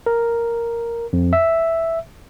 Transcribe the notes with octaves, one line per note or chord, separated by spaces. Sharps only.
A#4
F2
E5